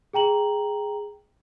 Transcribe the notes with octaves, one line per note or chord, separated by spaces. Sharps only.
G#4 G5 A#5 F#7